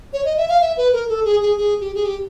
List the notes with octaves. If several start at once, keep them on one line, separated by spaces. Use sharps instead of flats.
C#5
D#5
E5
F5
E5
B4
A#4
A4
G#4
G#4
G#4
G4
G#4
G4